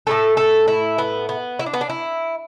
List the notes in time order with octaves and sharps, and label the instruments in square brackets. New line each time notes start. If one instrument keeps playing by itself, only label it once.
[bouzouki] A2 E3 A3 A4
A4
E4
B3
B3
E4
D4
B3
D4
E4